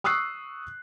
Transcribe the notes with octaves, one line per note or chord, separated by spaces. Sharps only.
C#6 D#6 E6 F#6 C7